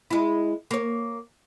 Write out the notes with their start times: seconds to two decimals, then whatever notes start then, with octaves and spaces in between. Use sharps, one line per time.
0.10 G#3 E4
0.71 A#3 C#5